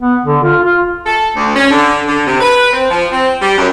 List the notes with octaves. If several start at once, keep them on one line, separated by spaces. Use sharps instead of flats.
B3
D3
F4
F4
A4
D2
C#4
D3
D3
C3
B4
C4
F3
C4
G3
F#2